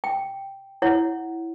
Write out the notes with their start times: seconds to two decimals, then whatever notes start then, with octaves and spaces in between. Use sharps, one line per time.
0.04 G5
0.82 E4 C#5 F#5